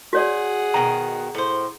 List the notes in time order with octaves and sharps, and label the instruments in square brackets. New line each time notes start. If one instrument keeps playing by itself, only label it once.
[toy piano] F#4 C#5 D5 [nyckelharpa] G#4 F#5
[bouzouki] B2 D#3 [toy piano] A#5
[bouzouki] A2 C5